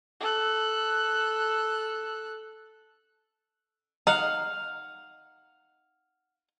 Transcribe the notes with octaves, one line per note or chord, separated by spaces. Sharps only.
A4 F#6
D#4 F5 F#5